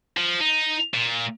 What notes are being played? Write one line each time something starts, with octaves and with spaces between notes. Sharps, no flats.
F3
D#4
A#2